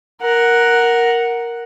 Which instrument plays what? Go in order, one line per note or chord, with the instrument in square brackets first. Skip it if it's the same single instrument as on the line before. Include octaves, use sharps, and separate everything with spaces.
[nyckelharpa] A#4 F#5